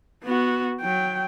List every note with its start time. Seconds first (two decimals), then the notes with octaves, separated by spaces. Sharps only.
0.24 B3 F#4
0.81 F#3 G5